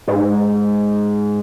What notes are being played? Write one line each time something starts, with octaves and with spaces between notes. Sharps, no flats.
G#2